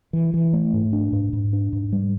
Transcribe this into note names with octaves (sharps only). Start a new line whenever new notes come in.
E3
E3
A3
G#2
D4
G#2
G#2
D4
G#2
G3